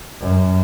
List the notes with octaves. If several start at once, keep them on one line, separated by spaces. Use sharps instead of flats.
F#2